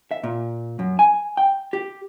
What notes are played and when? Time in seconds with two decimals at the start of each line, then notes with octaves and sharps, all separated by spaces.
0.11 E5
0.24 A#2
0.79 F#2
0.99 G#5
1.37 G5
1.73 G4